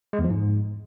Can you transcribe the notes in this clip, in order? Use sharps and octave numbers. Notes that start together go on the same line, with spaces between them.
G#3
E2
F3
G#2